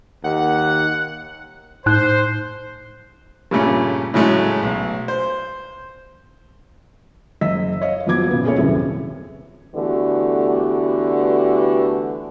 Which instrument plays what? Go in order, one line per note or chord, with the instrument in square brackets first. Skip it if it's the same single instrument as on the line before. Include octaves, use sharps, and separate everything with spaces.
[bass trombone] D#2 [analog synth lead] F#5
[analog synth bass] A2 [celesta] D#4 F#6 [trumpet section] C5
[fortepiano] G2 A#2 C#3 A3 C#4
A2 C#3 F#3 G#3 A3 C#4
B1
C5
[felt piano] F#1 D#5 E6 B6
C#5 D#5 F5
F#1 F3 F#3 B3 D6 G#6
A#2 C#3 B3
B3 C#4 G#4 A4 C#5
D#1 C2 F#2 C3 E5
[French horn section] D3 E3 A3 B3 F#4 G4